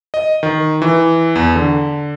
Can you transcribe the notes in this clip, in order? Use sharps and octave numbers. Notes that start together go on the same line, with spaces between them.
D#5
D#3
E3
E2
D3